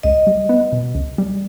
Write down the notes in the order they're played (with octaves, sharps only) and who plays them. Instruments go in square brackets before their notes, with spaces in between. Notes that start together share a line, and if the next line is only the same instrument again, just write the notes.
[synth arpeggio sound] C#2 [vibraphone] D#5
[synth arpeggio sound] G3
B3
B2
C#2
G3